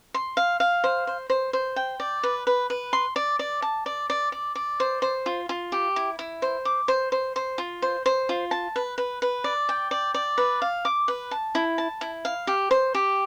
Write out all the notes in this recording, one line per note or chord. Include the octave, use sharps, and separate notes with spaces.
C6
F5
F5
C5
C5
C5
C5
G5
D5
B4
B4
B4
C6
D5
D5
A5
D5
D5
D5
D5
C5
C5
F4
F4
G4
E4
E4
C5
D6
C5
C5
C5
F4
C5
C5
F4
A5
B4
B4
B4
D5
G5
D5
D5
B4
F5
D6
B4
A5
E4
A5
E4
F5
G4
C5
G4